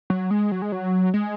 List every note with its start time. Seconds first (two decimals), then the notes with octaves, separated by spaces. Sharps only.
0.10 F#3
0.31 G#3
0.52 F#3
0.62 G#3
0.72 F#3
1.14 G#3